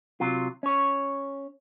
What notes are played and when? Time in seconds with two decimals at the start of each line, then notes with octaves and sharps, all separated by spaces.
0.20 C3 F#3 F4
0.63 C#4 C#5